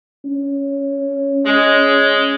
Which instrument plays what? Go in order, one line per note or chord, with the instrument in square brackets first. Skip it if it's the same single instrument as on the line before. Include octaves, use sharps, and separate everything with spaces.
[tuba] C#4
[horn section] G#3